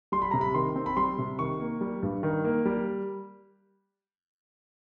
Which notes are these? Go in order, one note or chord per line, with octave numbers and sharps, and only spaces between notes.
G3 C6
B5
C3 A#5
B5
D#3 C6
C4
B5
G3 C6
C3
D#3 C#6
A#3
G3
G2
D#3
A#3
G3